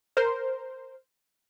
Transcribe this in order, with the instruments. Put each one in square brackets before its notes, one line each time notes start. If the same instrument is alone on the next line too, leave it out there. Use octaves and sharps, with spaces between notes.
[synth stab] A#4 C5